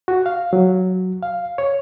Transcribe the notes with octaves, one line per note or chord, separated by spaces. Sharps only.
F#4
F5
F#3
F5
C#5